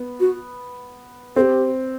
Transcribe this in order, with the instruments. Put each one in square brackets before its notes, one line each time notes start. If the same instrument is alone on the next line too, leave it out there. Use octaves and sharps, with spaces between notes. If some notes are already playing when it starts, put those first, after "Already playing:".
Already playing: [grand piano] B3
[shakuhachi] F#4
[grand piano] C4 [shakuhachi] G4 A4